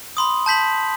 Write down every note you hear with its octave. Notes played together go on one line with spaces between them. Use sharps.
B5 C6 D#6
A5 G6 B6 F#7